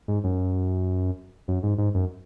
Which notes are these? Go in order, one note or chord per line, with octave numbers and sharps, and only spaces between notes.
G#2
F#2
F#2
G#2
G#2
F#2